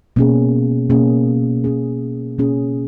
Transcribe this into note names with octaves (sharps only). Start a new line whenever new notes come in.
B2 A#3 C#4 G#4
B2 A#3 C#4 G#4
B2 A#3 C#4 G#4
B2 A#3 C#4 G#4